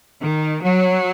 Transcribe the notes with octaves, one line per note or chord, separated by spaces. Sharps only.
D#3
F#3